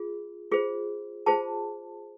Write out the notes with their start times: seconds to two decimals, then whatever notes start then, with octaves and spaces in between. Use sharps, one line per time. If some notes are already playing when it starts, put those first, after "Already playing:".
Already playing: F4 G#4
0.51 F4 G#4 C5
1.26 F4 G#4 C5 A5